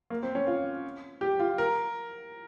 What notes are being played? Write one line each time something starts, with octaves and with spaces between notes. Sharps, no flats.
A#3
C4
C#4
F4
G4
F4
A#4